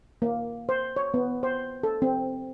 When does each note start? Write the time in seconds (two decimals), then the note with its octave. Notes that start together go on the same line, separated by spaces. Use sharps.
0.22 A#3
0.69 C5
0.96 C#5
1.14 B3
1.43 C5
1.83 A4
2.02 C4